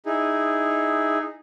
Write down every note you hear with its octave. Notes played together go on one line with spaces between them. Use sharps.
D#4 E4 G#4